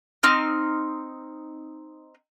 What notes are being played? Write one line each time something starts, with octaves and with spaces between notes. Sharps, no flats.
C4 D#4 F6